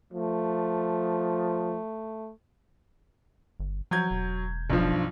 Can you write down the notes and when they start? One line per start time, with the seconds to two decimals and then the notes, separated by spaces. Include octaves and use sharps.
0.13 F3 A3
3.60 G1
3.91 F3 F#3 G6 G#6
4.11 E1
4.70 B1 G2 F3